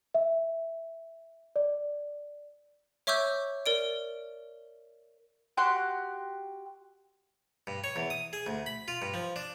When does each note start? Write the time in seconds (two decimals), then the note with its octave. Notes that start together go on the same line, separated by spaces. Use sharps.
0.14 E5
1.56 D5
3.07 C#5 E5 C#6 D6 E6 G6
3.66 A#4 D5 D7
5.57 F#4 G4 C6 F#6
7.67 G2
7.84 C#5
7.96 E2
8.10 D#6
8.33 G#4
8.46 D2
8.66 B5
8.88 F4
9.02 G2
9.14 F3
9.36 D4